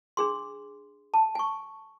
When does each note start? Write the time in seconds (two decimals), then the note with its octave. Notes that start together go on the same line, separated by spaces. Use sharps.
0.17 D4 G#4 C6
1.14 A5
1.35 G#5 C#6